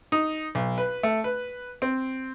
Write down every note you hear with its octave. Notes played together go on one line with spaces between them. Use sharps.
D#4
B1
B4
A3
B4
C4